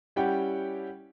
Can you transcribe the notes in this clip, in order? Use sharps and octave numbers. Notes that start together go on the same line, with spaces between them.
G3 C#4 E4 G4 F#5 G5